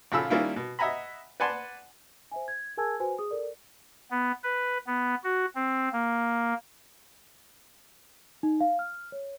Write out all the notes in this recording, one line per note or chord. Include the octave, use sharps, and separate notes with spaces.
A#1 C#3 F4 A4 B5 E6
D#3 G3 A#3 C#4 E4 F4
B2
D#5 E5 F#5 G#5 A#5 B5
B4 D5 F#5 G#5 A5 C6
C5 E5 G#5
G#6
G#4 A#4 G#5 A5 E6 G#6
F#4 B4 C5 G#5
G#4 D#6
A4 A#4 D5
B3
B4
B3
F#4
C4
A#3
D#4
F5
F6
C#5